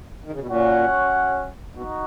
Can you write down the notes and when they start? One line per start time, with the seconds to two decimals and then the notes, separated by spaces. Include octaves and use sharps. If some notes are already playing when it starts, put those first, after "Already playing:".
0.24 D#3
0.32 C#3
0.40 B2
0.46 A#2 C#4 F#4 C#5 F#5
1.76 B2 D#4 F#4